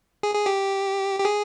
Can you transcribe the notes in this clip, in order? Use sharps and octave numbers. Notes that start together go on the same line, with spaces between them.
G#4
G#4
G4
G4
G#4